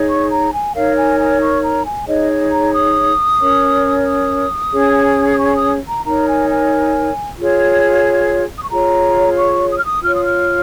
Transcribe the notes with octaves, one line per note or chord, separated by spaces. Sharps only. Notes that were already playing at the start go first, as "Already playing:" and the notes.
Already playing: D#4 G#4 C#5
C#6
A#5
G#5
D#4 A#4 C#5 F5
G#5
G#5
C#6
A#5
G#5
D#4 G#4 C#5 D#5
A#5
D#6
C#4 A#4 C#5
D#6
C#4 G#4 C#5
D#6
C#6
D#6
A#5
D#4 A#4 C#5 A#5
G#5
G#5
F4 G#4 C#5
D#6
C#6
F4 G#4 C#5 A#5
C#6
D#6
F6
D#6
F4 C#5 F6
D#6
F6